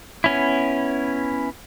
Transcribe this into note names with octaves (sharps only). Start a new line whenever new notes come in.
B3 C#4 E4